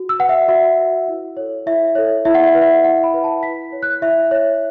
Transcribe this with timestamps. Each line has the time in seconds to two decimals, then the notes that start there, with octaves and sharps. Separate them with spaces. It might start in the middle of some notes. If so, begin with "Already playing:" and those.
Already playing: F#4
0.09 E6
0.19 B4 F#5
0.29 E5
0.48 F#4 E5
0.79 B4
1.08 E4
1.37 A4 C#5
1.66 E4 E5
1.95 A4 C#5
2.25 E4 E5
2.35 F#5
2.43 E5
2.54 B4 F#5
2.62 E5
2.84 E4 F#5
3.04 B5
3.14 B4
3.24 A5
3.43 E4 B6
3.72 C#5
3.83 F#6
4.02 E4 E5
4.31 C#5